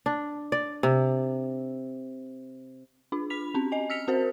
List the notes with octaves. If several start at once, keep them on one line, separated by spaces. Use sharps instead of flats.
D4
D5
C3
D4 F4
B5 B6 F7
C4 C#4
D#5 G#5
E6 F6 B6 C#7 F7
C4 F#4 A#4 C5